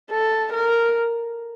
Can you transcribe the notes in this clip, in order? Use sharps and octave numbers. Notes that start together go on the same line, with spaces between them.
A4
A#4